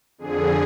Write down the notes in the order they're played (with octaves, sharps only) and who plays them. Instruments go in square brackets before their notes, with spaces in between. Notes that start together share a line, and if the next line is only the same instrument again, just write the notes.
[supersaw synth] F2 D3 G#4